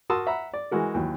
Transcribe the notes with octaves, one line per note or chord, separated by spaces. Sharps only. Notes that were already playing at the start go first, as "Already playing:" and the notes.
F#4 A#4 A5 C6 D#6 E6
E5 F#5 A#5 B5
D5
E3 G#3 F#4 A#4
D#2 E3 F#3